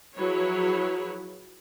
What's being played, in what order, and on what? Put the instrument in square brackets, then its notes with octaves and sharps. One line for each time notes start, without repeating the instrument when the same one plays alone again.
[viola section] F3 F#3 E4 G#4 B4 C#5